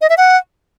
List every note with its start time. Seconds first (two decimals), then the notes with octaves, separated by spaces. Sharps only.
0.01 D#5
0.09 E5
0.18 F#5